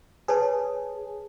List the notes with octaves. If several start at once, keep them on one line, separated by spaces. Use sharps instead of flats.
G#4 B4 C#5 A5